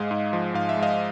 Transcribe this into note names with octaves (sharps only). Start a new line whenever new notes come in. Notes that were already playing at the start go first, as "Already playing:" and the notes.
Already playing: G#2 G#3 D#5 F5
G#2
F3
G#2 F5
E5
G#3
D#5 F5